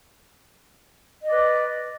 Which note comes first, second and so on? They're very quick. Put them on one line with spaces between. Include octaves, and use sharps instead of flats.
D#5 D5 B4